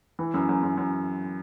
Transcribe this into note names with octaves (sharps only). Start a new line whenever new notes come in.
E3
F#2
F#2
F#2
F#2